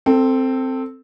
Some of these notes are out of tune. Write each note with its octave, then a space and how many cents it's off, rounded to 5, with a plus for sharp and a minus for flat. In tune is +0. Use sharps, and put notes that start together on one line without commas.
C4 +0 A4 +20